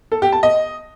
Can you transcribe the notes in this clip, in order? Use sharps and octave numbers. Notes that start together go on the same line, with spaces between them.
A4
G4
A5
D#5